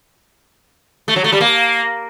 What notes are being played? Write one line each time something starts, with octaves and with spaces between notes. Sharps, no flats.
A3
F#3
A3
G3
A#3